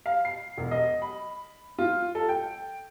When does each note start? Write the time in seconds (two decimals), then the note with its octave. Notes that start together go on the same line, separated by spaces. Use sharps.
0.06 F5
0.25 C7
0.57 E1
0.71 D#5
1.02 B5
1.79 F4
2.15 A4
2.29 G5